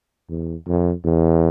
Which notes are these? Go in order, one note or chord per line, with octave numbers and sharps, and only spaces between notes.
E2
F2
E2